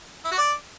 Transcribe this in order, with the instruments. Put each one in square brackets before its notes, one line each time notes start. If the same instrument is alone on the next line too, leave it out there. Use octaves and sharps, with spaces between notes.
[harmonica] E4
F#4
D5